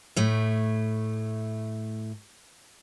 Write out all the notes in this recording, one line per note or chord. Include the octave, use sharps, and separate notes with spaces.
A2 A3